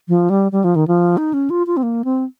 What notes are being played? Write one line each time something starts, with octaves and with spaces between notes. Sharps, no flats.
F3
G3
G3
F3
D#3
F3
D#4
C#4
F4
F4
C4
A#3
C4